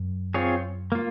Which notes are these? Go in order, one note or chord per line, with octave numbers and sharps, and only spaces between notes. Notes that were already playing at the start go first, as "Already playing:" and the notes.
Already playing: F#2
C4 F4 G#4 C#5
A#3 F4